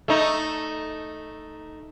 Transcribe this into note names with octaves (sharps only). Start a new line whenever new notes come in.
A3 D#4